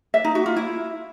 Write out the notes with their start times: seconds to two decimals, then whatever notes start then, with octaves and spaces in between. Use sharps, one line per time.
0.14 E5
0.24 D#4
0.35 F#4
0.46 F4
0.56 E4